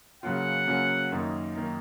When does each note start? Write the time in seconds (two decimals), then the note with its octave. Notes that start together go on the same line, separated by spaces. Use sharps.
0.23 C#3 F#3 A#3 C#4 F4 F#5
0.67 C#3 F#3 A#3 C#4 F4
1.12 F#2 D#3 A#3 D#4
1.56 D#3 A#3 D#4